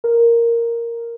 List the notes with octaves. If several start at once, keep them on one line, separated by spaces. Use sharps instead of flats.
A#4